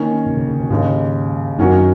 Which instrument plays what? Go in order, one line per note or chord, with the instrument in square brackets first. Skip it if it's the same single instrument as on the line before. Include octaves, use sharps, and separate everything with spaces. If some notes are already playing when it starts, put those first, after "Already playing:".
Already playing: [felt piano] D#3 A#3 C#4
[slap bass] B2
C#3
C#3
B2
[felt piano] D#2 C#3 G#3 [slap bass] G#2
[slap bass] F#2 [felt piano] D#3 F#3 C#4 F#4 A#4